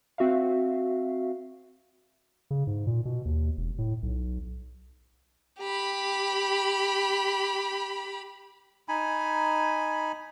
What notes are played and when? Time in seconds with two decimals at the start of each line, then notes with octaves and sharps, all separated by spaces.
0.18 C4 F#4 E5 F5
2.51 C#3
2.67 G#2
2.87 A#2
3.05 B2
3.25 D#2
3.57 E1
3.78 A2
4.03 B1
5.60 G4 B5
8.88 D#4 G#5 B5